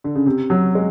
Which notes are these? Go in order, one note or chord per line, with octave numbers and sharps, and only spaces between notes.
D3
C#3
C3
F#3
G#3